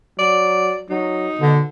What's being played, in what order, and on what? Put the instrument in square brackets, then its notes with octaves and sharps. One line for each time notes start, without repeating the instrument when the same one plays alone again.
[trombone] F#3 [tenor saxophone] D5
[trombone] F#3 [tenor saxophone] D#4
[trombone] B2 [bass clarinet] D3